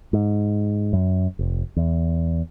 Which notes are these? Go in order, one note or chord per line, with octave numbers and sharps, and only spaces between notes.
G#2
F#2
F1
E2